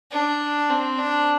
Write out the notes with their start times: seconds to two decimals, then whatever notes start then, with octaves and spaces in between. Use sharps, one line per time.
0.12 D4
0.70 C4
0.98 D4